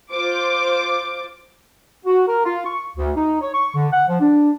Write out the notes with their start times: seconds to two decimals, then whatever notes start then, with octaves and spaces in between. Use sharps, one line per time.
0.12 F4 C5 D6
2.05 F#4
2.28 A#4
2.45 F4
2.66 C#6
2.96 D2
3.16 D#4
3.41 C#5
3.54 C#6
3.75 D3
3.92 F#5
4.08 F3
4.21 D4